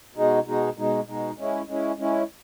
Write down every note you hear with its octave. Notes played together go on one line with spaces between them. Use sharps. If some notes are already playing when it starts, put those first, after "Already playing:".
B2 G#3 D#4
B2 G#3 D#4
B2 G#3 D#4
B2 G#3 D#4
G#3 C#4 E4
G#3 C#4 E4
G#3 C#4 E4